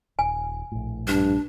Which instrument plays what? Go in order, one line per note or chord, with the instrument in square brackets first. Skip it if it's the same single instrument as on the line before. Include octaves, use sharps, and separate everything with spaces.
[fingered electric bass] D#1 [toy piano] G#5
[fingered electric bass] A#1 A2
[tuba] G2 [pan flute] D4